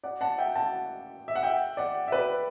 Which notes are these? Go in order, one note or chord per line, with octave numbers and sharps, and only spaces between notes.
D5 F#5
F#5 A5
E5 G5
F#5 A5
E5
F#5
E5 G5
D5 F#5
E5
B4 D5